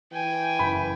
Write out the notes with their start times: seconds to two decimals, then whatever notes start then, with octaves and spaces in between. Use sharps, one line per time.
0.12 E3 G5 G#5
0.59 F#1 B5